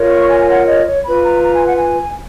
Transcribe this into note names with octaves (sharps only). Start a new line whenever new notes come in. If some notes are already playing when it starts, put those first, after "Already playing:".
Already playing: F4 A#4 C#5
C#6
G#5
G#5
F#5
D#5
C#5
F4 B4 B5
A#5
A#5
G#5
F#5
G#5